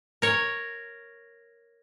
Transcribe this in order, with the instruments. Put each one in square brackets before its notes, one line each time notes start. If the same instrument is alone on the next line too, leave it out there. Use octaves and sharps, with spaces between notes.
[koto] A#4 C#5